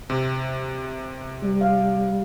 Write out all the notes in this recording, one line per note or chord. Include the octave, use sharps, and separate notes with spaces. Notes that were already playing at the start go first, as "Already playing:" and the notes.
C3
G3
F5